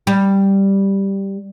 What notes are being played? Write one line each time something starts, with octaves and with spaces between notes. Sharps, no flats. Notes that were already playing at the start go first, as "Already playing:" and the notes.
G3